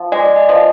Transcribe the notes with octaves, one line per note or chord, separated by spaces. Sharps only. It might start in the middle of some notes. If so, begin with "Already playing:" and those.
Already playing: F3
G#3 D5
D#5
F3
D#5